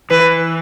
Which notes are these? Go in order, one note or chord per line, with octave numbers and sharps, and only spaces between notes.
E3 B4